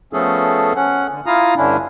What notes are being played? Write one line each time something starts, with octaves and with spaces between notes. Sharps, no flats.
F3 A3 B3 C#4 G#4 A4
C#4 F#5
D3
E4 F4 F5 A#5 D#6
G2 D3 C#4 D4 E4